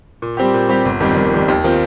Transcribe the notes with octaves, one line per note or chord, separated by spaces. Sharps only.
A#2
G3 C4 G4
A#2
G3 C4 G4
G1
F2 D#3 G3 A#3
G1
F2 D#3 G3 A#3
D#2
D#3 C4 F4